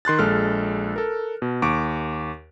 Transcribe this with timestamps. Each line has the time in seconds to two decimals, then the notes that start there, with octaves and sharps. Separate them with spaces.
0.05 D#3 C6 F#6 A6
0.19 A#1 G#3 A4 F6
0.96 A4 A#4
1.42 B2
1.62 D#2 C#6 D6 D7